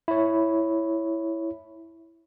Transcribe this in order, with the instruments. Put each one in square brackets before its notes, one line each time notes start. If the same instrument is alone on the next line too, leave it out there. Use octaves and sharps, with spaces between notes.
[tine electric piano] E4 C#5